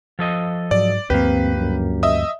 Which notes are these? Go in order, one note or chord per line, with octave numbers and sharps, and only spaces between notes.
F3 A4 D#5
G#2 F#3 D5
D2 G2 F3 A#3 C4 G4 B4
F#2
D#5 E5 D#6